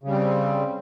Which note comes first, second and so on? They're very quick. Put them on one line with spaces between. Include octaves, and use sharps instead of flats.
C#3 G3 C4